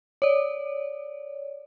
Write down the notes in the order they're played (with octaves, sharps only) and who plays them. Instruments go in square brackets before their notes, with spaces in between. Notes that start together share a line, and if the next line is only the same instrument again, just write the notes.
[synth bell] C#5 D5